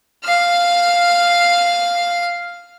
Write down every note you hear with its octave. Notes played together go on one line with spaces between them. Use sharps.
F5 F6